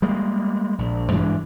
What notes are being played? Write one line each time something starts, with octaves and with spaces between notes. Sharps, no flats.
G3 G#3 A#3
A#1
G2 E3 G#3 D4